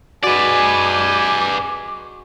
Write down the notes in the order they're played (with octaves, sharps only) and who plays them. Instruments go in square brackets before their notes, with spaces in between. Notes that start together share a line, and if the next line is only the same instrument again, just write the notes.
[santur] G#3 F#4 [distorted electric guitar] B4 D5 [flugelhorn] G#5 [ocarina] D6